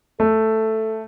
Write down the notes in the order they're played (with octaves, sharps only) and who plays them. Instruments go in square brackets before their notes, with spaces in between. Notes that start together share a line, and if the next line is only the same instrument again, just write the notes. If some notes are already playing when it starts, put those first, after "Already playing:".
[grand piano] A3 [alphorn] A4